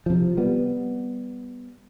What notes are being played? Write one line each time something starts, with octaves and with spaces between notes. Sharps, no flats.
C3 F3
G3 B3